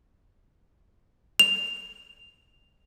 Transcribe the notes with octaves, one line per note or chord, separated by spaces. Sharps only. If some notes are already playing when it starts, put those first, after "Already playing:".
F7